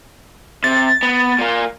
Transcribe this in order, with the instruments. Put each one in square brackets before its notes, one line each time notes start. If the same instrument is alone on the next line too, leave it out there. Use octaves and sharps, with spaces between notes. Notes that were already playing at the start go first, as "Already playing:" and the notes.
[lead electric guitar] C3 [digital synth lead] A6
[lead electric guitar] B3
A#2 A#3